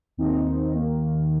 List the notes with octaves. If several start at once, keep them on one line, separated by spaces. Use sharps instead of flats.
D#2 D#3 C4 D#4
D#2 D#3 A#3